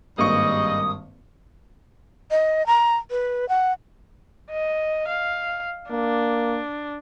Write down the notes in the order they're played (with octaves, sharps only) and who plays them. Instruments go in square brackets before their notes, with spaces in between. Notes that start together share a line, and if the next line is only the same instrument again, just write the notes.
[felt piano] G#1 G2 [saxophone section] G3 G#4 D#5 [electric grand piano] A#3 C#6 [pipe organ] D#6
[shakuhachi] D#5
A#5
B4
F#5
[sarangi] D#5
F5
[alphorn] A#3 [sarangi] D4